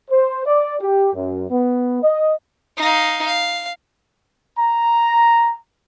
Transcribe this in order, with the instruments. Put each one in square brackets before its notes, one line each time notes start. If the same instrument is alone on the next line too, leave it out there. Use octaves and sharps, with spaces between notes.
[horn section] C5
D5
G4
F#2
B3
D#5
[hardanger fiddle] D#4 F5
F5
[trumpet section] A#5